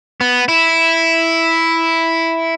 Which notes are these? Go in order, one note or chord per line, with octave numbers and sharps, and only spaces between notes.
B3
E4